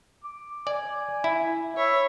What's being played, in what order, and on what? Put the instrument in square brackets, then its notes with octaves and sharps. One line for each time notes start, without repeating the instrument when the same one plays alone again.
[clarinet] D6
[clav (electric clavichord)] D5 [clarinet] G#5
[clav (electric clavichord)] E4
[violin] C#5 [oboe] E5 [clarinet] B5